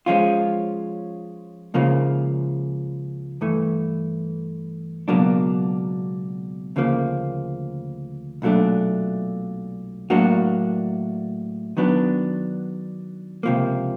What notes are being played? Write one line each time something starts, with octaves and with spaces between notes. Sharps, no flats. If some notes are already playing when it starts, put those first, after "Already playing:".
F3 G#3 C#4 F4
C#2 C#3 F3 A#3
G2 E3 A3
C#2 B2 F#3 A#3 D4
D2 C#3 F3 A#3
B1 A#2 F#3 A3 D4
A2 F#3 A#3 D4 F#4
D#3 F#3 B3 D4
C#2 C3 F3 A#3